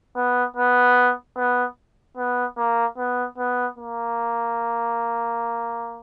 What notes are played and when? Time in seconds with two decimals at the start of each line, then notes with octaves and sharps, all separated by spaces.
0.16 B3
0.57 B3
1.37 B3
2.17 B3
2.57 A#3
2.98 B3
3.38 B3
3.78 A#3